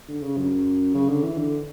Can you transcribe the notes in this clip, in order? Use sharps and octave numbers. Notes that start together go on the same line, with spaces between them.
D3
C#3
F#2
C#3
D3
E3
D3